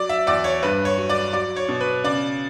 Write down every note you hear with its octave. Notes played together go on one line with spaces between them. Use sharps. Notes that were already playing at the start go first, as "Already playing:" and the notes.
Already playing: F#3 D5
E5
E2 D5
C#5
G2 B4
C#5
F#3
D5
F#3 D5
C#5
B2
B4
C#3 D5